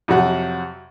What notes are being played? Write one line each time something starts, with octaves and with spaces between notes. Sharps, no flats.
F2 C3 F#3 F#4 F#5